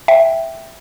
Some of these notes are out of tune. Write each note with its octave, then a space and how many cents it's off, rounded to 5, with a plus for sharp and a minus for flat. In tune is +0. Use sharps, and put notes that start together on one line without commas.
E5 +0 G5 +0